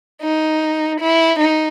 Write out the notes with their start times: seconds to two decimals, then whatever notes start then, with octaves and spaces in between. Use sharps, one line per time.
0.22 D#4
1.00 E4
1.39 D#4